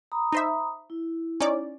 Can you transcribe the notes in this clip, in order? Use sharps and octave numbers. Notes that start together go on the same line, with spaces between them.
A#5 B5 D#6
D#4 C5 E5
E4
C#4 D#4 D5